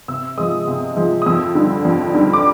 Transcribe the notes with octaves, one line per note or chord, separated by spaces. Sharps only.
C3 E6
F3 G#3 D#6
C3
F3 G#3
D#6
F2 E6
D3 G3
F2
D3 G3
D6